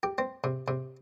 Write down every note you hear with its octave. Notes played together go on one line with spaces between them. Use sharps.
G4
C4
C3
C3